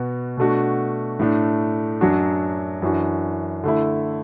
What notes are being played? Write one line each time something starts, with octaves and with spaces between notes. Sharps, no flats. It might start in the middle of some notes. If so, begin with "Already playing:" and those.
Already playing: B2 B3 F#4
B2 A3 D4 F#4
A2 A3 D4
F#2 F#3 D4 F#4
F#2 E3 D4 F#4
D3 A3 E4